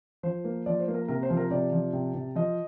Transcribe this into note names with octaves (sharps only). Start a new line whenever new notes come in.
F3 C5
A#3
F3 D5
C5
A#3
A#4
C3 A#4
C5
F3
A#4
C3 D5
F3
C3
C3
F3 D#5